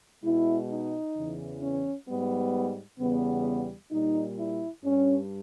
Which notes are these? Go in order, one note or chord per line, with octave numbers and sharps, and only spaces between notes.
B2 G#3 E4
D#4
E2 C#3 E3
C#4
G#2 G3 B3
E2 C#3 G3 B3
A#2 G3 D#4
E4
G2 G3 C#4